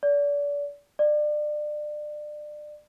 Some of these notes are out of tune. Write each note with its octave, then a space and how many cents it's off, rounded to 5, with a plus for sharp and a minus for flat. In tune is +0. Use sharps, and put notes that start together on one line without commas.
D5 -35
D5 +30